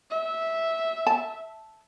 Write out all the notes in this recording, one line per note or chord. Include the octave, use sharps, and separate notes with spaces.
E5
A5